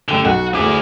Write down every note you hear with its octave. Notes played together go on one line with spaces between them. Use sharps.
A1 D3 G5 G7
B1 F#4 F#5
D2 E4 G#4 D6